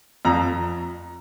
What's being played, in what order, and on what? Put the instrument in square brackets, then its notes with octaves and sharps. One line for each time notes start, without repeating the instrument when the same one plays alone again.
[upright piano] F2 A#5